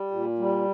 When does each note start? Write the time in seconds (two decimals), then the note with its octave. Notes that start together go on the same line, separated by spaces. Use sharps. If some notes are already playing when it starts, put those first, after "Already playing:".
Already playing: G3
0.11 A#2
0.39 G3